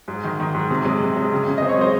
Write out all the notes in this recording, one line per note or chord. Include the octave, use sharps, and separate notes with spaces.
G#2
D#3
D#3
G#2
C3
G#3
C3
G#3
C#3
C#3
C4 D#5
C#5
G#3 C5